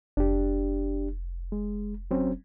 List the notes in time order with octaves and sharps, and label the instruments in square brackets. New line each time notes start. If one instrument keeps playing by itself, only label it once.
[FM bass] F1 [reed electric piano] D4 G4
[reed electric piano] G#3
F#3 C4 C#4